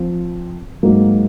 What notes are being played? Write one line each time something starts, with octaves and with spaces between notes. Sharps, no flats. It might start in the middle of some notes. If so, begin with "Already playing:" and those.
Already playing: F3 C4
G#2 F#3 A#3